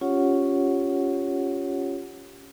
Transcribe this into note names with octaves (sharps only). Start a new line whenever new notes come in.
C#4 F4 G4 C#5 F#5